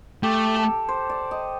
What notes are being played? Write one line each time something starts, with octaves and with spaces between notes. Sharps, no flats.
A3 G4
A4
C5
D5
D#5